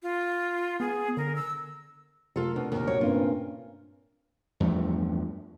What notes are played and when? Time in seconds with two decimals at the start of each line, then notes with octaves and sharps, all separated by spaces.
0.03 F4
0.80 B3 G#4
1.17 D3 A#4
1.35 E6
2.36 C3 A3 F4 A4 A#4
2.56 B2 D4
2.72 D#2 A#2 A#4
2.87 F#4 C#5
3.01 G2 A#3 C4 C#4 F4
4.60 E2 G2 F3 A3